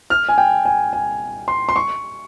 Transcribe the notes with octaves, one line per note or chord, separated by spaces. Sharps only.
F6
G#5
G5
G#5
G#5
C6
C6
C#6